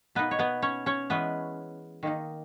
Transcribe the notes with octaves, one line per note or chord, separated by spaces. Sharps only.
B2 A#3 B3 D#4 B4
C#5
B3 B4
C#4 C#5
C#4 C#5
E3 G#3 B3 C#4 B4
D#3 A#3 D#4